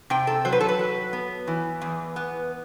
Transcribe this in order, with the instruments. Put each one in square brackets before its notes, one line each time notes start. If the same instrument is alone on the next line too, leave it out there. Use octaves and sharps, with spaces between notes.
[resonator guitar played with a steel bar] C3 G5
A4
F#3 C5
B4
A4
B4
F#3
B3
E3
E2
B3